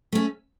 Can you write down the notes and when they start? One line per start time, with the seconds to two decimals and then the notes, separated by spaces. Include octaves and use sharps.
0.12 A3 C#4